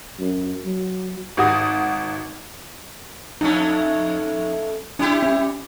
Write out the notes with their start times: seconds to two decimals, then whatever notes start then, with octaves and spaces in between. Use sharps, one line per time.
0.20 F#2
0.65 F#3
1.37 G#1 F#4 D#6
3.41 F2 A3 C#4 D#4
4.99 G3 D4 E4 G4
5.23 C#4